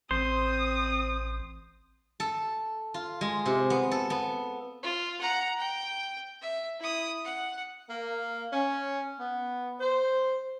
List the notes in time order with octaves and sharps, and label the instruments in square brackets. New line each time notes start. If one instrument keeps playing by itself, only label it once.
[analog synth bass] A1 [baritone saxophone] C4 [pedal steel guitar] C5 [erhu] D#6
[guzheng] A4
F4
G#3
C3
B3
A4
B3
[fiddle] F4
F#5 A#5
G5
E5
E4 D#6
F#5
[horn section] A#3
C#4
B3
C5